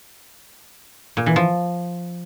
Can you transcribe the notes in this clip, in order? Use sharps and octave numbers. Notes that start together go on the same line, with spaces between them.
A#2
E3
F3